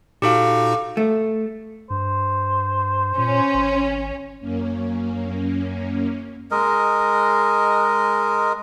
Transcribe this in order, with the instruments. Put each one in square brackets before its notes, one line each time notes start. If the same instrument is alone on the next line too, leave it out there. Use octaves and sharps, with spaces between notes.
[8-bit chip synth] A#2 D#4 F#4 [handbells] G4 A4 F5
[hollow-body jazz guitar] A3
[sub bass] G2 [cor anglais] C5
[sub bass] A#2 [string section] C#4
[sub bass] G#1
[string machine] F#2 A#3 C#4
[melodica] G#3 A#4 D#5